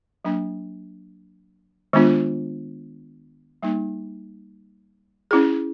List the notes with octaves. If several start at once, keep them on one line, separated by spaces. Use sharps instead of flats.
F#3 A#3 D4
D#3 G#3 B3 D4 F4
G3 A#3 D#4
C#4 E4 G#4